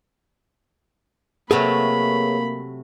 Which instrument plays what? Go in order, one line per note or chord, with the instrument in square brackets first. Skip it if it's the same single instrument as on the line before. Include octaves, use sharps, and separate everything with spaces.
[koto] C3 F#3 A3 [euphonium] A#3 [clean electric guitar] G#4 B4 C#5 [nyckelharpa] B5